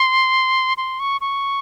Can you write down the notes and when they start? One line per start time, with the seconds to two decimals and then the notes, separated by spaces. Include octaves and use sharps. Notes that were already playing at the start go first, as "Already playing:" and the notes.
Already playing: C6
0.77 C6
1.00 C#6
1.21 C#6